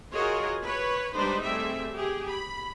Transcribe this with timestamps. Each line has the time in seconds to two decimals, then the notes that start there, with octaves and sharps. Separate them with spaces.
0.14 F4 F#4 G#4 A#4 C#5 D#5
0.63 B4 C#5
1.14 G3 G#3 D4 D#4 B4 C5
1.43 G3 A3 C4 G#4 E5
1.95 G4 G#4
2.29 B5